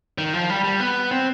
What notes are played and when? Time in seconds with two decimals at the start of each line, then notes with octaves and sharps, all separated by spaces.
0.18 D#3
0.34 F3
0.50 G3
0.64 G3
0.80 B3
1.11 C4